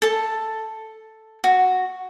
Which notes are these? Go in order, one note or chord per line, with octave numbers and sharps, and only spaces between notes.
A4 A5
F#4